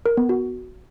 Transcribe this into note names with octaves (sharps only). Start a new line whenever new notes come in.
A#4
B3
F#4